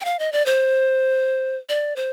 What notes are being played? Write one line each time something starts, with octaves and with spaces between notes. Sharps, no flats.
G5
F5
D#5
D5
C5
D5
C5